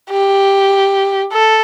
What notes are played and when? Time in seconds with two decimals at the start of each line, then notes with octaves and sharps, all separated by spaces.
0.11 G4
1.33 A4